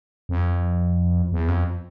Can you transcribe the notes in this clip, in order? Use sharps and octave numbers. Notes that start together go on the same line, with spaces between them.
F2
E2
F2